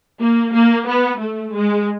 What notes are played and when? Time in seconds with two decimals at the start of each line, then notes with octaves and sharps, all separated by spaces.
0.20 A#3
0.53 A#3
0.86 B3
1.19 A3
1.53 G#3